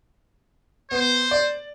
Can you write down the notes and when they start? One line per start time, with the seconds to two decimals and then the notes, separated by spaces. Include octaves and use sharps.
0.91 B3 C5
1.31 D5